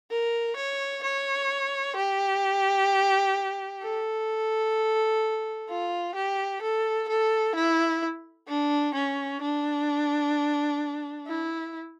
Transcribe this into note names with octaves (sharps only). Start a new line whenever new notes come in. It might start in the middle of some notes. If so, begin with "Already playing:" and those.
A#4
C#5
C#5
G4
A4
F4
G4
A4
A4
E4
D4
C#4
D4
E4